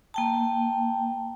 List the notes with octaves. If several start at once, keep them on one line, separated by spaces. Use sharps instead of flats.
A#3 G5 A5